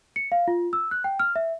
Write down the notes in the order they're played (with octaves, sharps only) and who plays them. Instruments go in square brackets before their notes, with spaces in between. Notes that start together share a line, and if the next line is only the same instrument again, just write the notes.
[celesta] C#7
F5
F4
E6
F#6
G5
F6
E5